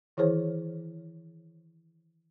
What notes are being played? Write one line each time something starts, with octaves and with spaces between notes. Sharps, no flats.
D#3 E3 E4 G#4 C5 C#5